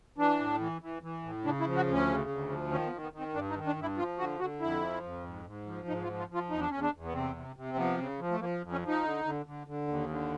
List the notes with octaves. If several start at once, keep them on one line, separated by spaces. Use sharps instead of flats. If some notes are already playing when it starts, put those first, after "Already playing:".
E3 D4
A2
E3
E3
E3
A2
C#3 D4
E4
F3
F#4
D2
C#4
C#3
D2
F3
D#3 C#4
B3
D#3
B3
D#3
C4
G2 D4
D#4
D#3
D4
G2
E4
F3 F4
D3 F#4
D3 F#4
F2 E4
F3
F2
G#2
G#2
F3
G#2 D#4
F4
F3
F4
F3 F4
E2 D#4
D4
E2 C#4
D4
E2
B3
C3 C4
C3
C3
C4
F3 B3
C#3
F3
A3
F3 A#3
F2
C#4
F3
D#4
D3
D3
D3
D3
D#2
D3